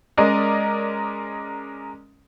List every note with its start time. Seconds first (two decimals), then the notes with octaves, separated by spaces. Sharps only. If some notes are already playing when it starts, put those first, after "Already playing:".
0.17 G#3 C#4 A#4 D5 D#5